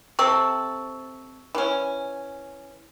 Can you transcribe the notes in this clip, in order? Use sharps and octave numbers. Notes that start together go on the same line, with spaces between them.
C3 C4 A4 C#6 E6
E3 C#4